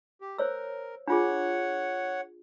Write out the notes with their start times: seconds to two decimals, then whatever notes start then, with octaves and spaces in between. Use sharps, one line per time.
0.21 G4
0.38 A#4 C5 C#5 E6
1.08 D4 F4 G#4 C#5 F#5